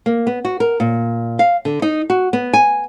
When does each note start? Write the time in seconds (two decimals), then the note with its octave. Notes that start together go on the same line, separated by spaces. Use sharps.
0.06 A#3
0.27 B3
0.45 F#4
0.60 A#4
0.80 A#2
1.39 F5
1.65 D3
1.82 D#4
2.10 F#4
2.33 B3
2.53 G#5